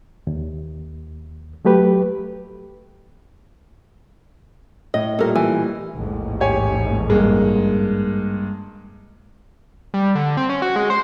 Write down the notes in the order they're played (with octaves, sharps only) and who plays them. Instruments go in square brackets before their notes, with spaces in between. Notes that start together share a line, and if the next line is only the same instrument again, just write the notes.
[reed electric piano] D#2
F#3 A3 G4 B4
[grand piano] A2 [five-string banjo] D#5
[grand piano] A#2 G3 A3 [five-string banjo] A4 A#4
[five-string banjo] E3
[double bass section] A1 D#2 G#2
[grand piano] G4 C#5 G#5
G2 G#3 A#3
[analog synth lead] G3
D3
C4
C#4
F#4
G#3
C5